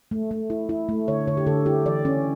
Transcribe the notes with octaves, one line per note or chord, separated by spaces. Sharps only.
A3
A3
E4
E4
A3
D3 C#5
D3 C#5
G4
D3 A4
E4 G4
E3 D5
C#4